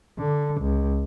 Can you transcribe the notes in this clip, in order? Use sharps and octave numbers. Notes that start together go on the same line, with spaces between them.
D3
C#2